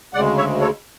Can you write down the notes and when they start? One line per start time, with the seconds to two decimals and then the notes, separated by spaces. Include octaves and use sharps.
0.13 D2 C#3 G#3 D5 F#5
0.37 C#5 E5
0.61 A4 C#5